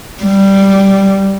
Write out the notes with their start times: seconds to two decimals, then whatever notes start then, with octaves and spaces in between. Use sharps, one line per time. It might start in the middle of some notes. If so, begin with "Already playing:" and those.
0.23 G3